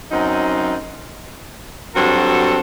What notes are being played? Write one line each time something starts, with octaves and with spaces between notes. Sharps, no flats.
F#2 F#3 C4 D#4
G2 F#3 C4 F#4 A4